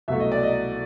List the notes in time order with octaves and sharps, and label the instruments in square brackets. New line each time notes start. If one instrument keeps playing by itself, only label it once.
[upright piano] C2 B2 F#3 A3 E5
D#5
D5
D#5